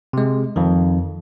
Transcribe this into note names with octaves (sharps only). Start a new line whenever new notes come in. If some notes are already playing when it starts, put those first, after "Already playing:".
C3 G#3
F2 D#3